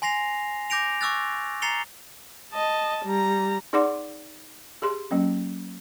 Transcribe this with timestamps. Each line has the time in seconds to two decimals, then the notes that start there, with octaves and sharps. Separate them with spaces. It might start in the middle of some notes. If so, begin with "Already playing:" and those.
0.02 G#5 C6 A#6 C7 F7
0.70 D6 G6 A#6 D7 F7
1.01 C#6 D6 E6 F#6 A6
1.62 A#5 A6 C7 C#7 F7 G7
2.53 D#5 A5
3.05 G3 A#5
3.73 D#4 G#4 D5 F#5 C6 D6
4.82 G4 G#4 C6
5.11 F#3 A#3 C#4